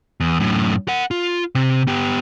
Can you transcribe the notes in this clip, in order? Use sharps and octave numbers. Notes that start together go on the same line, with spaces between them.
E2
F#2 A2
A#4 F#5
F4
C3
B3 G4